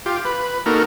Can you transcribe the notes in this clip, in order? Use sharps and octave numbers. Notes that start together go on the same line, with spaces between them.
F4 G4
B4
A#3 D#4 F#4 A4 A#4